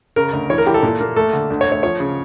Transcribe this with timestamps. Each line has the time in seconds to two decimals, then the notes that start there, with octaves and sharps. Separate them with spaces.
0.16 C#3 A#4
0.33 D2
0.50 E3 C#5
0.58 A#4
0.66 E3 G4
0.74 A4
0.83 A#2
1.00 A#3
1.16 A3 A4
1.33 D3
1.50 D2
1.61 C#5
1.66 A3
1.72 C#5
1.83 F3 C#5
2.00 C#3